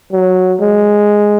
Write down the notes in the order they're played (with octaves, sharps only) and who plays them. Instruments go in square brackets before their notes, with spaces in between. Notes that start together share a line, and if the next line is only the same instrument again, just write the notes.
[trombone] F#3
G#3